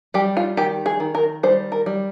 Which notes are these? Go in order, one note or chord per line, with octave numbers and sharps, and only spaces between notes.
G3 G4
F4
D#3 G4
G#4
D#3
A#4
G3 C5
A#4
G3